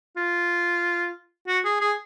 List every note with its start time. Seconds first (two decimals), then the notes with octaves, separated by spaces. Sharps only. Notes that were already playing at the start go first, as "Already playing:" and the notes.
0.17 F4
1.47 F#4
1.65 G#4
1.81 G#4